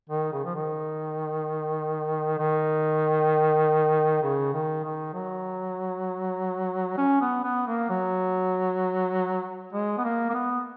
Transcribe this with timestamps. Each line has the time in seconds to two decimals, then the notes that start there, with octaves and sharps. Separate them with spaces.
0.09 D#3
0.33 C#3
0.45 F3
0.55 D#3
2.39 D#3
4.23 C#3
4.53 D#3
4.84 D#3
5.14 F#3
6.98 C#4
7.21 B3
7.44 B3
7.67 A#3
7.90 F#3
9.73 G#3
9.98 B3
10.04 A#3
10.30 A#3
10.34 B3